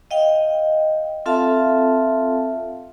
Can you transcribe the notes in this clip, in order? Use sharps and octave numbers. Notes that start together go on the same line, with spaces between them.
D#5 F5 G5
C4 F4 A4 E5 F5 A5